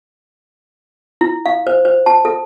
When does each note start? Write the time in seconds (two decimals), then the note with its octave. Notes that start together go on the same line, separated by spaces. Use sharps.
1.21 E4
1.46 F5
1.67 C5
1.85 C5
2.06 A5
2.25 A4